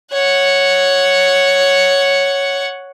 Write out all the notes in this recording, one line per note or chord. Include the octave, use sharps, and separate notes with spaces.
C#5 F#5